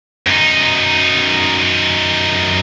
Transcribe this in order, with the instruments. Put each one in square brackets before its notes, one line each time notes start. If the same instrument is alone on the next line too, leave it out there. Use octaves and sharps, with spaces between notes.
[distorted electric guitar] F#2 D#4